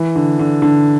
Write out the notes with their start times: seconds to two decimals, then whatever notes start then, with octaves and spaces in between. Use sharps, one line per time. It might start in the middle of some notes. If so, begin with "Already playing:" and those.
Already playing: E3
0.16 D3
0.39 D3
0.62 D3